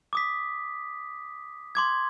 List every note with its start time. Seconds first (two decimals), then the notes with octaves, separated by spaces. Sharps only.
0.13 D6 D#6 B6
1.75 C6 D6 G#6